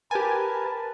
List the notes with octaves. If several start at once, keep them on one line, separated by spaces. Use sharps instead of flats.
G4 A#4 B4 G#5 A5